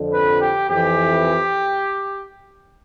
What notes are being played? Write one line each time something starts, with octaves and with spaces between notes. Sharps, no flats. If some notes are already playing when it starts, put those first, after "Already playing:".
Already playing: F2 D3
B4
G4
F2 E3 G4